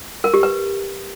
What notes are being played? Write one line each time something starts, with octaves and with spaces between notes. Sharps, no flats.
A#4
G4
B4